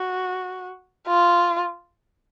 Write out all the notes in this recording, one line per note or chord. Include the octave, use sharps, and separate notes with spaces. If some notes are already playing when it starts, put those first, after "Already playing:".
Already playing: F#4
F4